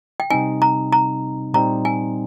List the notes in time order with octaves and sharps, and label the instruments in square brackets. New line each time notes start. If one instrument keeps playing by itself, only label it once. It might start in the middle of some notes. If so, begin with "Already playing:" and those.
[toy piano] G5
[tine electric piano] C3 G3 C4 D#4 [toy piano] G#5
[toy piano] A#5
A#5
[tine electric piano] A#2 G3 C4 D#4 [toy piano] A#5
[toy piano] G#5